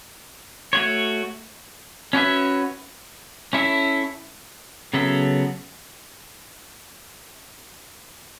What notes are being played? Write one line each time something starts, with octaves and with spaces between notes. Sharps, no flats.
A3 F#4 C#5
C#4 F#4 B4 E5
C#4 E4 A4 E5
C#3 F#3 B3 A4 E5